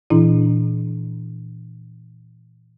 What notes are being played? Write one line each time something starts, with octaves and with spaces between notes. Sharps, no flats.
A#2 E3 D4 E4